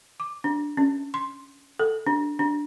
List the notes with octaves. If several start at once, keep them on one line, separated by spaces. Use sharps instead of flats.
D6
D4
C#4
C6
A4
D4
D4